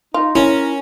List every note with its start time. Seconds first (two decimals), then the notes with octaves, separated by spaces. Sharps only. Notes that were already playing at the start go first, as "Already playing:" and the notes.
0.14 D#4 F4
0.35 C#4 E4 A#4